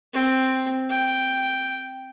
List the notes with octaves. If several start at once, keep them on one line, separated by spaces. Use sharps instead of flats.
C4
G5